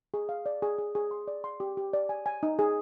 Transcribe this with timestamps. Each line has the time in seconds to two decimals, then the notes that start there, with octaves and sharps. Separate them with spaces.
0.14 G#4
0.29 F5
0.46 D5
0.62 G#4
0.78 G#4
0.95 G#4
1.11 C6
1.28 D5
1.44 C6
1.60 G4
1.77 G4
1.93 D5
2.09 G#5
2.26 G#5
2.43 D#4
2.59 G#4